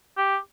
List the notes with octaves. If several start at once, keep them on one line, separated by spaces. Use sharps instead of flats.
G4